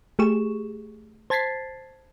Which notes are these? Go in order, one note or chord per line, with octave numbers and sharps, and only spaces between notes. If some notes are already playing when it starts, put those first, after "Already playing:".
A3 G4 G#4 C#6 E7
C5 A5 G#6 A6 B6 C7